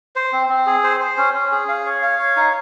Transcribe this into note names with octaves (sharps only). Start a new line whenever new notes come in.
C5
C4
C4
G#4
C5
C5
C#4
C#4
G#4
F5
C#5
F5
C#5
D#4